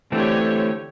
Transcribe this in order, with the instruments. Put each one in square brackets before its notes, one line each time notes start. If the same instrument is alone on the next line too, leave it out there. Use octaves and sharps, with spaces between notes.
[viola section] D3 G4 C#5 [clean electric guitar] E3 A3 C4